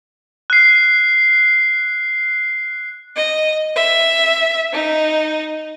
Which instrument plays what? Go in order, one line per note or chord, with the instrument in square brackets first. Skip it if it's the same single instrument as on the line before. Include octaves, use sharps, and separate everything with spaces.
[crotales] F#6 C7
[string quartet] D#5
E5
D#4